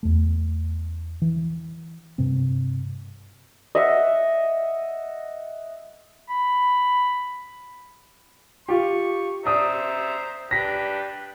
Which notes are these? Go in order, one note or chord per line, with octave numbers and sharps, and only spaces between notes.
E2 A3
E3
G2 C3 C4
D#5 E5 F#5
B5
F4 G4 C#6
C5 D5 E5 A#5 D#6
D4 G4 B4 A#6 B6